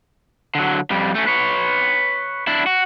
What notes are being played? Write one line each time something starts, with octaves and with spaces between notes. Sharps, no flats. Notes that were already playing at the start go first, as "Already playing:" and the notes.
D3 F#3
F2 G3
A3 C#4
B4 C#5
D4 E4
F#4